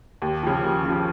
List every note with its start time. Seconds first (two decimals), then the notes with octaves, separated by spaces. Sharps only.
0.22 D#2
0.43 C#3 F3
0.63 D#2
0.85 C#3 F3